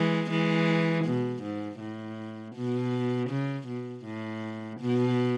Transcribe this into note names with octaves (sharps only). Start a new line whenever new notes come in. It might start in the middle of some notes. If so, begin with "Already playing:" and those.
Already playing: E3 G#3
E3 G#3
B2
G#2
A2
B2
C#3
B2
A2
B2